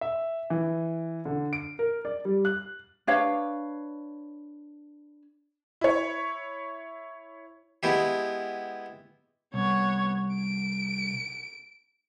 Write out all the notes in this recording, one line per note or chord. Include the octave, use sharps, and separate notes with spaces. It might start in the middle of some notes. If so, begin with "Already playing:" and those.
E5
E3
D3
D7
A#4
D5
G3
F#6
D4 B4 C#5 F5
E4 C#5
G#3 B3 E4 G4
C2 B3 C#5
D7